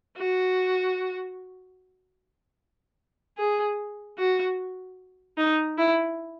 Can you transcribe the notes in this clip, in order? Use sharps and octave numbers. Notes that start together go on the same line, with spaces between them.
F#4
G#4
F#4
D#4
E4